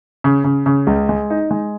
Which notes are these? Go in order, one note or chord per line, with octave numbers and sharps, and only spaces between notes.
C#3
C#3
C#3
C#2
G#3
D#4
G#3